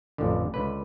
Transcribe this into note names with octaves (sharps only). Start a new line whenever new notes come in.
A1 F2 D3
C#2 D3 B4